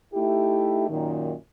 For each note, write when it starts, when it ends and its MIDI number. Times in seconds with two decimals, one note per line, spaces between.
0.14 0.87 57
0.14 0.87 63
0.14 0.87 64
0.14 0.87 67
0.89 1.32 42
0.89 1.32 46
0.89 1.32 51